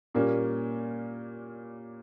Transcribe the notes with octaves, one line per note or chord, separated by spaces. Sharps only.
A#2 G3 A#3 C#4